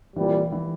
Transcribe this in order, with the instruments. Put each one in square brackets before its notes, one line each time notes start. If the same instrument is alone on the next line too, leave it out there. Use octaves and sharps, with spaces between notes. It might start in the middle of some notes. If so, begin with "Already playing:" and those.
[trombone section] C2 A#2 G3 [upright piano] E3
[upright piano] E3